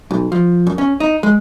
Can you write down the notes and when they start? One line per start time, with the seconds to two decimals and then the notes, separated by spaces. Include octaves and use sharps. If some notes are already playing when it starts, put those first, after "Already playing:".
0.11 B1
0.32 F3
0.67 F#2
0.78 C#4
1.00 D#4
1.23 G#3